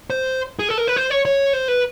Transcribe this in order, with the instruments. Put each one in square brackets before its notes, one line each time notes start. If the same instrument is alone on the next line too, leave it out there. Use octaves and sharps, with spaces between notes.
[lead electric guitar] C5
G#4
A4
A#4
B4
C5
C#5
C#5
C5
B4